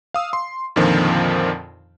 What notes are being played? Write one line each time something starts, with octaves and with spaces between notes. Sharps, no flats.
F5 D#6 E6
C6
F2 A#2 D3 D#3 F3